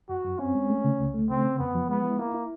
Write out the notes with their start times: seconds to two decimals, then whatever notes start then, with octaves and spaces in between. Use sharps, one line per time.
0.09 F#2 F#4
0.24 F#2
0.39 C4 C#4
0.55 G#3
0.70 A3
0.84 C#3
0.99 C#2
1.14 A3
1.30 C#3 C4
1.44 C#3
1.59 F2 B3
1.75 F3
1.89 G#3 B3
2.05 E4
2.19 A#3 E4
2.34 E4